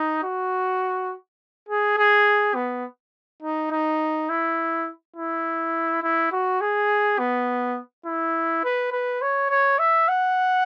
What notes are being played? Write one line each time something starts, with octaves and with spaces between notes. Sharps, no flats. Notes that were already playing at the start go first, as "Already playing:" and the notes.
Already playing: D#4
F#4
G#4
G#4
B3
D#4
D#4
E4
E4
E4
F#4
G#4
B3
E4
B4
B4
C#5
C#5
E5
F#5